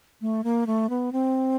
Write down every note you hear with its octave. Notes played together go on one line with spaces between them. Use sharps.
A3
A#3
A3
B3
C4